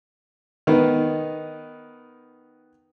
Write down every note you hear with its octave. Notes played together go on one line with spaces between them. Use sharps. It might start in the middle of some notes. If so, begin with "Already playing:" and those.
D#3 B3 D#4